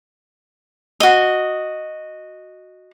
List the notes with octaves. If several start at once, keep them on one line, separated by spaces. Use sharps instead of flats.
F#4 D#5